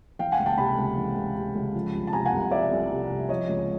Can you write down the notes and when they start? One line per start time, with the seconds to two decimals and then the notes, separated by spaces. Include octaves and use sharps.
0.19 E3 F5 G5
0.32 F#5 G#5
0.39 C#2
0.46 G5 A5
0.58 C3 A5 B5
0.78 C#2
0.97 E3
1.16 C#2
1.36 C3
1.55 C#2
1.74 F3
1.93 C2
2.07 A5
2.13 C3 G#5 A#5
2.26 F#5 G#5
2.33 C2
2.51 F3 D5 E5
2.71 C2
2.91 C3
3.10 C2
3.29 F3 C#5 D#5
3.49 C#2